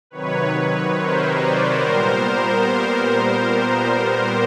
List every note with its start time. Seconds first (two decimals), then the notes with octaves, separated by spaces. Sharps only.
0.10 C3 D#3 F#3 B4 C#5
0.53 B4 C#5
0.96 A#4 C5
1.38 C5 D5
1.80 A#2 G3 B3 A#4 C5